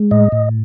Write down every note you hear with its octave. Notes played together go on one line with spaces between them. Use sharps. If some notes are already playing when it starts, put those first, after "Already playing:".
Already playing: G#3
A2 D#5
A2